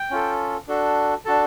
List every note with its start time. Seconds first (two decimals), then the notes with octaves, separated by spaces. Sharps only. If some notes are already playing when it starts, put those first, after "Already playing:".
Already playing: G5
0.11 C#4 F4 A4
0.68 D4 F#4 A4
1.25 D4 F#4 A4 A5